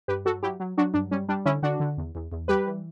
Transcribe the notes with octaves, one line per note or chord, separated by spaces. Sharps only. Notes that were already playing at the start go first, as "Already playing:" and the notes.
G2 G4 B4
F#3 F#4 A4
F#3 E4 G4
F#3
F#3 D4 F#4
G2 D4
G3 C#4
G3 D4
D3 C#4 E4
D3 D4 F#4
D3
E2
E2
E2
G3 G4 B4
E3